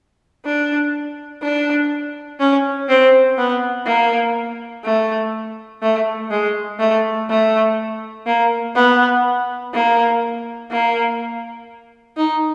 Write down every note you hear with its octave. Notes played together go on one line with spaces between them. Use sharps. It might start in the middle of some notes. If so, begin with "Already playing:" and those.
D4
D4
C#4
C4
B3
A#3
A3
A3
G#3
A3
A3
A#3
B3
A#3
A#3
D#4